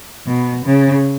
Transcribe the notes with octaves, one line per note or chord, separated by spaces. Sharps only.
B2
C#3